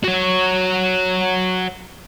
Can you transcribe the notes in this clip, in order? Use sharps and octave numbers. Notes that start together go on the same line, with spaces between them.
F#4 C#5